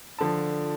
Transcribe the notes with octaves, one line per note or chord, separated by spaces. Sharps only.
D3 F3 A5